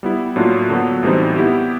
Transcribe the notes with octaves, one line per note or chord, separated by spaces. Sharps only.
G3 B3 E4
A2 F#3 A#3 D4 F4
D3 F#3 B3
A2 E3 G3 C4 D#4
B3 E4 G4